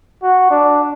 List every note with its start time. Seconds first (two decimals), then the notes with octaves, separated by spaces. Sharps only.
0.23 F#4
0.51 D4